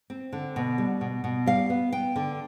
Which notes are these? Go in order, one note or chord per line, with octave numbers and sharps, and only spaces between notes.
C4
D3
B2
G3
B2
B2
G3 F5
B3
B3 G5
D3